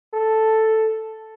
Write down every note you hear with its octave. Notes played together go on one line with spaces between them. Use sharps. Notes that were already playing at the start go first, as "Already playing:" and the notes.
A4